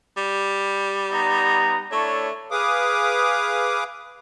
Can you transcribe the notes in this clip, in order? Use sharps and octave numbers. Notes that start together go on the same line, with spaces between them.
G3
B3 D#4 A#5
A3 D4 E4 C#5
G#4 B4 F5 D6 D#6